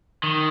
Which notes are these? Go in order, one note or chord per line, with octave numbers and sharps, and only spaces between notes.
D#3